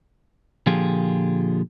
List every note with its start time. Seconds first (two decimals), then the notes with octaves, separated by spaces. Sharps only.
0.66 A#2 D3 F3 F4 G4 G#4